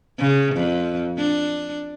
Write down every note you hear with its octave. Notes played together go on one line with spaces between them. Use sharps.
C#3
F2
D4